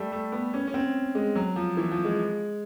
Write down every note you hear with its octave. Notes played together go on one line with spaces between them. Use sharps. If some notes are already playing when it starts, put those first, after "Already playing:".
Already playing: G3 A3
A3
B3
C#4
C#4
C4
G#3
F#3
F3
E3
F3
G#3